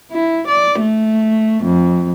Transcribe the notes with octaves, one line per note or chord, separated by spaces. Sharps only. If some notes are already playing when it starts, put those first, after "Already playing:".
E4
D5
A3
F2